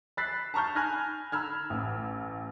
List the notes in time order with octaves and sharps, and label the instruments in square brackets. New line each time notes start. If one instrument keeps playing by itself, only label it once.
[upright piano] B5 E6 F#6 A6 B6 C7
A5 A#5 C#6 F6 G6
G#5 B5 F6 F#6 G#6 A#6
A#5 B5 E6 F6 G#6
A1 E6